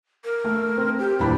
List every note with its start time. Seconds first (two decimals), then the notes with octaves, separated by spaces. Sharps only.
0.24 A#4
0.44 A3
0.77 C4
0.99 G4
1.19 D#1 E3 D4 B5